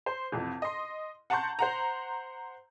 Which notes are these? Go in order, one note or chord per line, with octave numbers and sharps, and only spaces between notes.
C5
A1 F2 C3
D#5 C6
F#5 A5 A#5 C6 C#6 G6
C5 F#5 A#5